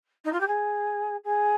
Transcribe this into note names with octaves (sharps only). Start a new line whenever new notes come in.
D#4
F4
G4
G#4
G#4